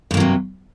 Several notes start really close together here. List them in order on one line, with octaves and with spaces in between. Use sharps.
G2 A#3 F#3 C3